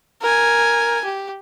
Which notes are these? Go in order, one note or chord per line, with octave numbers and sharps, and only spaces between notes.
A#4 G#5
G4